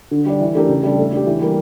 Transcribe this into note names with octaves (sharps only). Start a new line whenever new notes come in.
D3
G3 D4
E3
A3 D4 G4 A#4
C#3
G3 D4 A4
A3
D4 G4
E3
G3 A#3